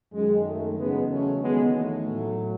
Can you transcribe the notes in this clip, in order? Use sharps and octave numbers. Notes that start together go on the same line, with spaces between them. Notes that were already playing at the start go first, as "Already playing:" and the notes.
F#2 D#3 F#3 G#3
A3
E2 C#3 F#3 G#3 B3
A3 C#4
E2 D#3 F#3 G#3 B3
A3
A2 F#3